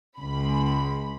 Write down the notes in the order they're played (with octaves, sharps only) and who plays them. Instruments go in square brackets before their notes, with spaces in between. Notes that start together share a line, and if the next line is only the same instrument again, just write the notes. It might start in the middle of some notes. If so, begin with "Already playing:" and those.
[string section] C#2 B5